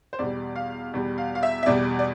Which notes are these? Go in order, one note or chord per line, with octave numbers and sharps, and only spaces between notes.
C5
E2 B2 G3 D5
F5
E2 B2 G3
F5
F5
E5
E5
E2 B2 G3 D5
D5